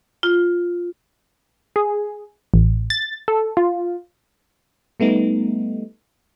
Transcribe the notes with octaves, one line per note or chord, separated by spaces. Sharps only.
F4
G#4
A1
A6
A4
F4
G3 A3 B3 D#4